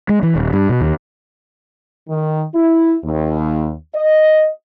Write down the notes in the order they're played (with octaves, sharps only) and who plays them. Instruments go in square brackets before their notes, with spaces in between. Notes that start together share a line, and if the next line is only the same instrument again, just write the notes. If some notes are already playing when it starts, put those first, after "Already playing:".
[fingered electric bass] G#3
E3
D#1
G2
B2
D#2
[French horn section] D#3
E4
D#2
D#5